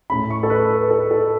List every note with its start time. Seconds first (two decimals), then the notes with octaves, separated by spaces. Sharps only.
0.10 A2 A3 C#4 B5
0.30 C#6
0.43 A4
0.50 B4
0.90 A4
1.11 A4